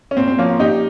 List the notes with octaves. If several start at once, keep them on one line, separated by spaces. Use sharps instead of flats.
C#4
A#2 C4
C4
F3 A#3 C#4
A#2 D#4 G4